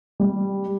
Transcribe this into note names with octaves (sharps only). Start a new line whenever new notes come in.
G3